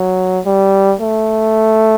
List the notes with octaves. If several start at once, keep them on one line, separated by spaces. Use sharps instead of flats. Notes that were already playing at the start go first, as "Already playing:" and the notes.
Already playing: F#3
G3
A3